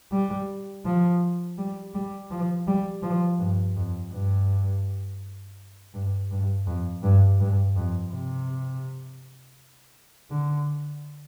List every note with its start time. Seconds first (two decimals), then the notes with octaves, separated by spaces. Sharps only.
0.12 G3
0.85 F3
1.58 G3
1.94 G3
2.31 F3
2.67 G3
3.03 F3
3.39 G2
3.76 F2
4.12 G2
5.94 G2
6.31 G2
6.67 F2
7.04 G2
7.40 G2
7.76 F2
8.12 C3
10.31 D3